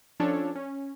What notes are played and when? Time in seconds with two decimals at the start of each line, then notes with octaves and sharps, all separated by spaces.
0.20 F3 C#4 D4 A4 C#5
0.55 C#4